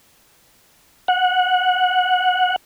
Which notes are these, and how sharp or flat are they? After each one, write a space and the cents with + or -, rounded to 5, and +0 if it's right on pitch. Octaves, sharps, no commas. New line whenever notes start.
F#5 -15